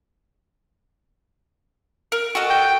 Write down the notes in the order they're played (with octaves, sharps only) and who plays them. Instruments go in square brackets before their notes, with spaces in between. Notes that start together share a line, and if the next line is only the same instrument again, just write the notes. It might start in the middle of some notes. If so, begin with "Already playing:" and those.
[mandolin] A#4
F#4 A4 D#5
[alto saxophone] G5